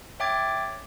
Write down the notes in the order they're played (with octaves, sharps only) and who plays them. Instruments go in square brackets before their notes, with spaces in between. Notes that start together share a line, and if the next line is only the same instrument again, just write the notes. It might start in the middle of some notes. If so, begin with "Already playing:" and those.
[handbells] C#5 E5 G5 D6 G#6 A6